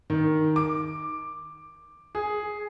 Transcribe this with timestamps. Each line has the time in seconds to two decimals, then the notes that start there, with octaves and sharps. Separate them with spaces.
0.10 D#3
0.56 D6
2.15 G#4